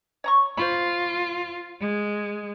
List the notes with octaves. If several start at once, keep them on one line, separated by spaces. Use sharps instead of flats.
C#5 A#5 C#6
F4 C5 B5
G#3